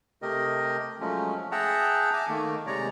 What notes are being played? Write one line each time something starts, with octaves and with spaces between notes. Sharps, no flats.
C3 A3 G4 A#4 D#5
F3 F#3 G#3 A3 C#4
G#4 E5 F#5 G5 A5 A#5
E5 G#5 A5 D6
D#3 A3 A#3
C3 G#3 C#5 D5 A#5